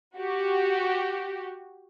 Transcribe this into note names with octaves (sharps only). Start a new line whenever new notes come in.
F#4 G4